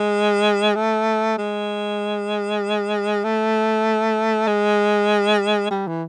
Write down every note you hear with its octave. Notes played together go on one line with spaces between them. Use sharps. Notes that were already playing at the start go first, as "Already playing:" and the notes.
Already playing: G#3
A3
G#3
A3
G#3
G3
E3